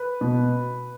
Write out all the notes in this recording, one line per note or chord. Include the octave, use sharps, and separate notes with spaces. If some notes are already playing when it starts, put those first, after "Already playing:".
Already playing: B4
B2